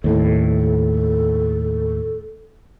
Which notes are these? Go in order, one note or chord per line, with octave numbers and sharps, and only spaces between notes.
D#2 A2 A4